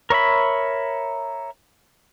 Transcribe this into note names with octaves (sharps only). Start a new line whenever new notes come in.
A#4 C#5 E5 B5